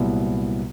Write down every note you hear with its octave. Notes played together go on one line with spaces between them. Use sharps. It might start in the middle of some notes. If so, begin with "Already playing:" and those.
Already playing: C2 A#2 F#3 B3 E4